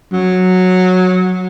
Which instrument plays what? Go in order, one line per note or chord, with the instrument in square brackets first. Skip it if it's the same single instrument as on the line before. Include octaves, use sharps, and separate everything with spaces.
[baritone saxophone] F#3